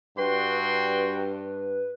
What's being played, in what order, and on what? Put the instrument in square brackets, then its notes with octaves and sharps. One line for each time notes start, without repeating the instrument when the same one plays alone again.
[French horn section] G2 [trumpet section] F#4 G5 C6 [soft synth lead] B4